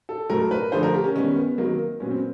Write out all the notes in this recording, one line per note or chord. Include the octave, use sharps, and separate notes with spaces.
A4
A2 F#3 A3 A#4
B4
D3 F3 A3 C5
A#4
G4
C#4
D#3 G3 B3 C#4
B3
C3 D#3 F#3 A#3
A#2 F#3 B3 C#4
C4